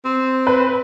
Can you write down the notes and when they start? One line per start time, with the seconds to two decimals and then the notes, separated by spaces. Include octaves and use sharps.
0.05 C4
0.47 B4